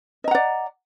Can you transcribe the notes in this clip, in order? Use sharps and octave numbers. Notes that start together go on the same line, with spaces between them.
D5 D#5 F#5 A#5